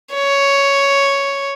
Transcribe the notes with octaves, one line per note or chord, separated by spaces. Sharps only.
C#5